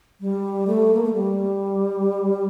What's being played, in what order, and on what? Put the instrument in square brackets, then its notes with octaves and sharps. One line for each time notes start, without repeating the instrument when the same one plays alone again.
[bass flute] G3
A3
A#3
A3
G3